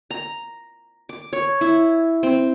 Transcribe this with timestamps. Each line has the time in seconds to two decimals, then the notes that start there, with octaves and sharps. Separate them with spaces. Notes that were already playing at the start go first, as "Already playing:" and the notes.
0.11 A#5
1.09 D6
1.33 C#5
1.61 E4
2.23 C4